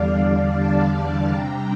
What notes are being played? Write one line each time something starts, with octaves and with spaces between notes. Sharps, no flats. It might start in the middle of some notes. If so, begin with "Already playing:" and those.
Already playing: E2 D3 G3 D4 D5 F5
F5 A5
C3 G3 D4 G5 A#5